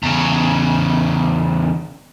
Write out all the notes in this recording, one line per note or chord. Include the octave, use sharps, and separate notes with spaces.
E2 C#3